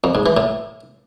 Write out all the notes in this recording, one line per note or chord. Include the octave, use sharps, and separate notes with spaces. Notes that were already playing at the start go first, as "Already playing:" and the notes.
F2
G#2
E3
A2